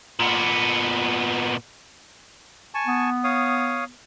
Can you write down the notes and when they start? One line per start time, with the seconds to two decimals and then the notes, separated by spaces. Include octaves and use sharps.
0.20 A#2 B3
2.74 G#5 A5 C#6
2.86 B3
3.24 C#5 F5 D#6